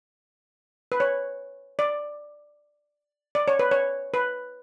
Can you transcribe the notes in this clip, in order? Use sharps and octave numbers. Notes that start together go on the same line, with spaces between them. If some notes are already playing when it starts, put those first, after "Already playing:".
B4
C#5
D5
D5
C#5
B4
C#5
B4